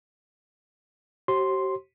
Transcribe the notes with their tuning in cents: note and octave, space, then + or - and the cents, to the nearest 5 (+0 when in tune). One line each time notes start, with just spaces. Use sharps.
G4 -45 C5 +40 C6 +0